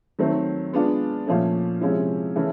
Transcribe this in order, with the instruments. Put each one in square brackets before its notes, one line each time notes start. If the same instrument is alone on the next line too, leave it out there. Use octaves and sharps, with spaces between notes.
[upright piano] D#3 F#3 A3 C4
G#3 B3 D4 F4
A#2 F3 A3 C#4
C3 F3 G#3 C#4 E4
C#3 E3 A3 C#4 E4